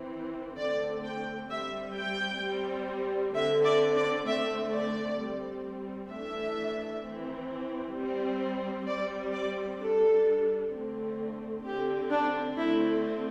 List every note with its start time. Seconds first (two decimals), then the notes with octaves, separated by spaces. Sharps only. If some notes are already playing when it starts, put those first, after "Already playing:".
Already playing: E3 C4
0.58 D3 A3 C4 D5
1.04 G5
1.50 G3 C4 E5
1.96 G5
2.42 G3 C4
3.34 D3 C4 E5
3.64 D5
3.96 D5
4.27 D3 A3 C4 E5
4.73 D5
5.18 G3 C4
6.11 E3 A3 D4 E5
7.03 E3 C4
7.95 G3 C4
8.87 G3 C4 D5
9.33 D5
9.79 G3 D4 A4
10.72 D3 A3 C4
11.64 D3 C4 G4
12.10 D4
12.55 D3 A3 C4 E4